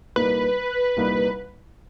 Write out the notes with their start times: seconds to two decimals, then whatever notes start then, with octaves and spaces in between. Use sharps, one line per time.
0.16 C2 A#2 G3 A#3 D#4 B4
0.97 C2 A#2 G3 A#3 D#4